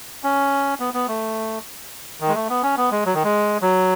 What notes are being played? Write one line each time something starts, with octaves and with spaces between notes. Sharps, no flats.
C#4
B3
B3
A3
D#3
G#3
A3
B3
C#4
B3
G#3
F#3
D#3
G#3
F#3